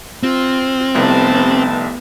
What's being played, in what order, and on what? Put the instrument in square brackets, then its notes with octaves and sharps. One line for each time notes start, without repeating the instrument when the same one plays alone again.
[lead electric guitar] C4 [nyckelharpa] F4
[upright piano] F1 C2 [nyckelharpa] B3 A5